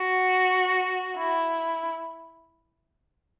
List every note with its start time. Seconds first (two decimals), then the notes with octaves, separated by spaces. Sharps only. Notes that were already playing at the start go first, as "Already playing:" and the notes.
Already playing: F#4
1.17 E4